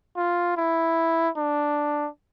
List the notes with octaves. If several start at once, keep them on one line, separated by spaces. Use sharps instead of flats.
F4
E4
D4